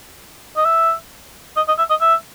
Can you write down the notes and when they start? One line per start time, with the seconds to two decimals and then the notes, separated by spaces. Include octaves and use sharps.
0.57 D#5
0.65 E5
1.57 D#5
1.68 D#5
1.78 E5
1.90 D#5
2.01 E5